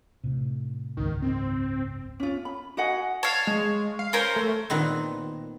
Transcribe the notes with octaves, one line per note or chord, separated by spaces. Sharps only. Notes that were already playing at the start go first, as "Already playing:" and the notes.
A2 C3
F#1 C#2 G#2 D#3
C4
C#4 F4
B5
F#4 D#5 F#5 G#5
C#5 F5 A5
G#3
F5
C#4 A#4 C5
A3
A#2 D#3 B3 C4